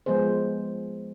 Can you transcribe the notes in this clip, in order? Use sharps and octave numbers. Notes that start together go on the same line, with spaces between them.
F3 G#3 B3 G#4 C5